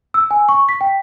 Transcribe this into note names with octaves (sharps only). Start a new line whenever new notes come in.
E6
G#5
C#6
B6
G5